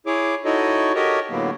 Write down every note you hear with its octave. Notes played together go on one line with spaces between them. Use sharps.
E4 G#4 C#5 D6
D#4 E4 F#4 A4 C#5 D#5
F#4 G4 A4 A#4 C#5 D#5
A2 D3 F#3 A#3 B3